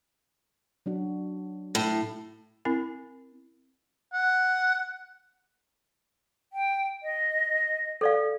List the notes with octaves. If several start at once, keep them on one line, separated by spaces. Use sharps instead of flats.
F#3 D4 F#4
A2
C4 E4 A#4
F#5
G5
D#5
A4 D5 F5